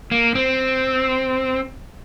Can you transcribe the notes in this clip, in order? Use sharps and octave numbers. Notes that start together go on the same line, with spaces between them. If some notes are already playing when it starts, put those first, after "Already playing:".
A#3
C4